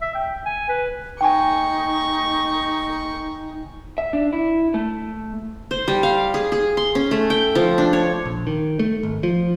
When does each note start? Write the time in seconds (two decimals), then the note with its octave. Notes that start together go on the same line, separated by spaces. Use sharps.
0.02 E5
0.15 G5
0.45 G#5
0.69 B4
1.21 D#4 G5 G#5 C#6
3.98 E5
4.13 D4
4.33 E4
4.74 A3
5.71 C5
5.88 G3
6.03 F5
6.34 G#4
6.52 G#4
6.77 C6
6.95 C#4
7.11 A3
7.30 G5
7.55 F3
7.78 D4
7.93 C#5
8.25 A#1
8.47 D#3
8.79 A3
9.03 G#1
9.23 F3